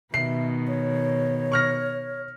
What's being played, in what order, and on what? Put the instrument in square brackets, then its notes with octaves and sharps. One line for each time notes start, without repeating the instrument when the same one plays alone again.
[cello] B2 D#3 [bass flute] E5 [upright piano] C7
[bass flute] C#5
[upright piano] C#6 F6 A#6